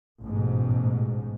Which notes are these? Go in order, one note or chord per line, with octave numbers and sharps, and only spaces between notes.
A1 G#2 B2